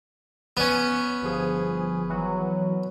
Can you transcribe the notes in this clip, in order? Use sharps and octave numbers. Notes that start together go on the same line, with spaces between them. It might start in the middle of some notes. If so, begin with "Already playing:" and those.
B3 C#4
G1 F3 G#4
E3 F#3